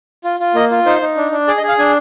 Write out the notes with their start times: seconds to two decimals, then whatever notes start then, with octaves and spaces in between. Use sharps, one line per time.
0.24 F4
0.40 F4
0.55 A#3 D#5
0.71 F4
0.86 D#4 C5
1.01 D#4
1.17 D4
1.32 D4
1.47 G#4 D5
1.57 D#5
1.63 G#4
1.68 F5
1.78 D4 G#5